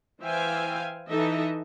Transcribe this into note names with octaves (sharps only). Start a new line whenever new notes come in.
E3 C5 E5 F5 G5 G#5
E3 D#4 A4 D#5 E5